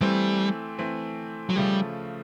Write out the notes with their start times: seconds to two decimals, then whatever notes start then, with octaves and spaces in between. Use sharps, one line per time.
0.01 E3 G3 A3 C4
0.79 E3 A3 C4
1.50 F#3
1.56 C#3 F3 G3 A3